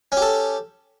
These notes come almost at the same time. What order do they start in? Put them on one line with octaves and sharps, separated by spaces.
C#4 G4 A4